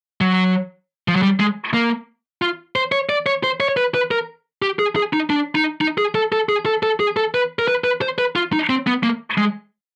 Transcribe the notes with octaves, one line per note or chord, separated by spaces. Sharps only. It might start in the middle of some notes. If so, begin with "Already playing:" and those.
F#3
F3
F#3
G3
G#3
A#3
F4
C5
C#5
D5
C#5
C5
C#5
B4
B4
A#4
G4
G#4
G#4
D#4
D4
D#4
D#4
G#4
A4
A4
G#4
A4
A4
G#4
A4
B4
A#4
B4
B4
C5
B4
F4
D#4
C4
B3
A#3
G#3